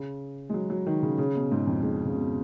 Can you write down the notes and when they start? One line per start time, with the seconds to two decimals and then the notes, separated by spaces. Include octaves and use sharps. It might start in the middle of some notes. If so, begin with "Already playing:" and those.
Already playing: C#3
0.50 G#3
0.54 F#3
0.70 F#3
0.87 D#3
1.02 C#3
1.18 C#3
1.36 B2
1.52 G#2
1.67 F2
1.83 G#2
2.05 C#3
2.16 B2